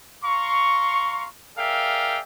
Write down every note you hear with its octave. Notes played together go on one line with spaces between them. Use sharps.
F5 A#5 C6 C#6
G#4 A#4 D5 E5 F5 G5